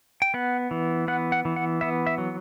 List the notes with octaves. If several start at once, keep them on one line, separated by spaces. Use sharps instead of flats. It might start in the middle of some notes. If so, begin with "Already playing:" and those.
G5
B3 F#5
E3
B3 F#5
F#5
E3
F#5
B3 E5
E5
F#3